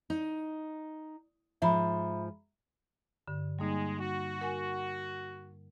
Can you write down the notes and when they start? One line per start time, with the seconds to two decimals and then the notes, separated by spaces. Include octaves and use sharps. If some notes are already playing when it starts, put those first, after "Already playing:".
0.10 D#4
1.62 G#2 F3 E5 A#5 B5
3.28 G2 D3
3.59 G3 G#3 A#3 D#4
4.00 F#4
4.41 A#4 F#5 G#5